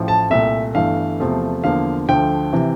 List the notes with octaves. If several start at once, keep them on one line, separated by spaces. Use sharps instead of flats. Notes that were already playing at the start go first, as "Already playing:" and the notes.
Already playing: A1 A2 F3
A5
C2 A#2 A3 E5
G1 G2 E3 A3 F5
E2 C3 F3 A3
E2 D3 F3 A#3 F5
D2 D3 F3 A3 G5
C3 E3